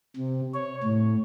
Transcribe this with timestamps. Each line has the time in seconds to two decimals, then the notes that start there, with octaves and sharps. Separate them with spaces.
0.17 C3
0.54 C#5
0.83 A2